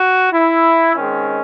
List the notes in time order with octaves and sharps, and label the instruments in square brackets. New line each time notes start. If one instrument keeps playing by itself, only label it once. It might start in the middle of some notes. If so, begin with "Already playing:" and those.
Already playing: [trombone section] F#4
E4
D#3 G#3 C4 C#4